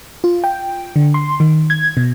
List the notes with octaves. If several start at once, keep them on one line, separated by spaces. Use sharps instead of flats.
F4
G5
D3
C6
D#3
G#6
B2